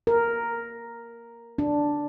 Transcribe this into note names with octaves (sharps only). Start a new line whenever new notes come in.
A#4
D4